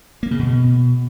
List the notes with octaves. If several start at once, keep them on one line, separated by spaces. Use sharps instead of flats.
A#3
C#3
B2